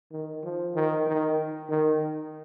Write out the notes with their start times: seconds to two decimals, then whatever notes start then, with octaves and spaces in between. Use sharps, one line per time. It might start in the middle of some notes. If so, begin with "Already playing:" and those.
0.12 D#3
0.44 F3
0.75 D#3
1.07 D#3
1.70 D#3